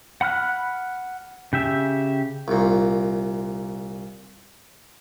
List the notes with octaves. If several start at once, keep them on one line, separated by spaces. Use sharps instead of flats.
F#5 B5 F6 F#6
C#3 G4 E5
C2 A#2